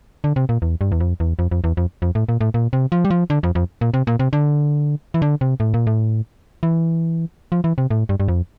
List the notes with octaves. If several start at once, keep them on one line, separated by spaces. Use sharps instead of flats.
D3
C3
A#2
E2
G2
E2
F2
E2
F2
F2
E2
F2
F2
A2
A#2
A2
A#2
C3
F3
G3
F3
D3
F2
F2
A#2
C3
A#2
C3
D3
E3
D3
C3
A2
A#2
A2
E3
F3
E3
C3
A2
G2
G2
F2